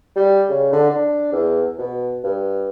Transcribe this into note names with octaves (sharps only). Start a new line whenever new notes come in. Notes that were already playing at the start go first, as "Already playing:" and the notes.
G3
C#3
D3
D4
E2
B2
G2